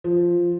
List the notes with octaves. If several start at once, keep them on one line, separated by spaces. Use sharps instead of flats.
F3